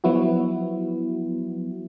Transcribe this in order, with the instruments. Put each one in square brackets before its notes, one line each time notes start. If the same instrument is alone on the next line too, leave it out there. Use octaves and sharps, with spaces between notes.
[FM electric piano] F3 F#3 B3 E4 F#4